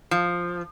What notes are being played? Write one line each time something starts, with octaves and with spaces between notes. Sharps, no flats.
F3